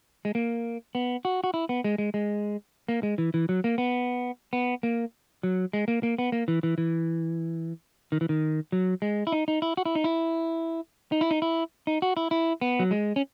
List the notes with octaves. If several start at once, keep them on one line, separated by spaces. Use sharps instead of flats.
G#3
A#3
B3
F#4
F#4
E4
B3
G#3
G#3
G#3
A#3
G#3
E3
E3
F#3
A#3
B3
B3
A#3
F#3
G#3
A#3
A#3
B3
A#3
E3
E3
E3
D#3
E3
D#3
F#3
G#3
E4
D#4
D#4
E4
F#4
E4
D#4
E4
D#4
E4
D#4
E4
D#4
F#4
E4
E4
B3
F#3
G#3
C#4